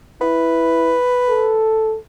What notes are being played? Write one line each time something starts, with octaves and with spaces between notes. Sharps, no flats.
E4 B4
A4